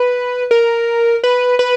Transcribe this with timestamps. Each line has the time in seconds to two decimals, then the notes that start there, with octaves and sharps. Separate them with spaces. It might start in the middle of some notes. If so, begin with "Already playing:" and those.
Already playing: B4
0.51 A#4
1.23 B4
1.59 B4